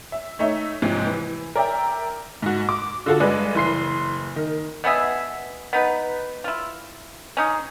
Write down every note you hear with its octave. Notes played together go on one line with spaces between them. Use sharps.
E5
A3 D#4 C#5 E5
A1 G#2 C3 F3 G#3
E3
A#4 D5 E5 G5
G#2 F#4
D6
D3 F4 F#4 A4
G2 G#3 B4 D5 F#6
F#1 E3 C6 C7
D#3
B2 B3 G#4 E5
B3 D#4 B4
E4 F4
C#4 D#4 G#4